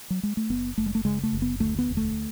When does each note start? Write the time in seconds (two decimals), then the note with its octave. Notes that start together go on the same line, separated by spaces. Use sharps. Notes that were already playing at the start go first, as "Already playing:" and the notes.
0.10 F#3
0.23 G#3
0.37 A3
0.50 F#1 B3
0.78 F#1 A3
0.86 G#3
0.95 A3
1.05 C#3 G#3
1.23 A3
1.33 F#1
1.42 B3
1.60 D2 A3
1.79 B3
1.88 E1
1.97 A3